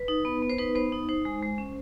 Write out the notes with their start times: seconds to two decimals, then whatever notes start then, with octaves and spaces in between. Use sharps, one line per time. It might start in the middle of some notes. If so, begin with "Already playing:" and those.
Already playing: B4
0.08 D#4
0.25 B3
0.42 B3
0.50 C5
0.58 D#4 B4
0.75 B3 C5
0.92 D#4
1.09 D#4 C5
1.25 G#3
1.43 G#3
1.58 C#4